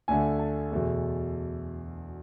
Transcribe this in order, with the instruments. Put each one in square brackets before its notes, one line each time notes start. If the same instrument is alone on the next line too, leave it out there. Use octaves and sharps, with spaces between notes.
[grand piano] D2 D3 A3 G#5
A5
E2 B2 A3